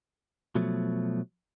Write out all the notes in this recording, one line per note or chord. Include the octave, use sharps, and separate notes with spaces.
B2 F3 F#3 A3